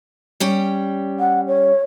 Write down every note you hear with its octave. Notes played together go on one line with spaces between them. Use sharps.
G3 C#4 G5
F#5
C#5